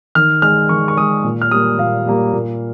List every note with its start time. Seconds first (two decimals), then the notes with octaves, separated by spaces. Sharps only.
0.15 D#3 F6
0.42 G#3 F6
0.69 D#3 C#6
0.88 C#6
0.97 G#3 D#6
1.24 A#2
1.42 F6
1.51 G3 A#3 D#6
1.78 A#2 F5
2.06 G3 A#3
2.33 A#2